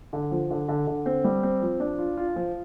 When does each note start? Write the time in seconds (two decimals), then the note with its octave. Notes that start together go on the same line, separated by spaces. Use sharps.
0.13 D3
0.31 F3
0.51 D3
0.68 D3
0.87 D3
1.06 C4
1.24 G3
1.43 C4
1.62 F3
1.80 D4
1.99 F4
2.17 F4
2.36 F3